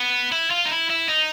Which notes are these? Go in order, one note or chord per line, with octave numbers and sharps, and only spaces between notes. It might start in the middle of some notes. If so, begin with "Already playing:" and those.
Already playing: B3
E4
F4
D#4
E4
E4
D#4